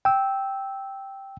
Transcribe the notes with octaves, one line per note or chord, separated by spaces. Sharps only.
G5 E6